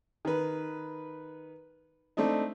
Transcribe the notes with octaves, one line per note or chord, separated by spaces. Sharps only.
D#3 B4
A3 C4 D4 D#4